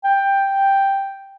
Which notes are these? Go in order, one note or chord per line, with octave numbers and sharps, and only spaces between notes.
G5